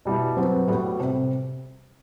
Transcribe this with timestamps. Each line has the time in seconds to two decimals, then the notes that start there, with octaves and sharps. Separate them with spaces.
0.05 B2 G3 B3 E4
0.37 F#3 C4 F#4 B4
0.68 A2 G3 B3 F#4
1.00 C3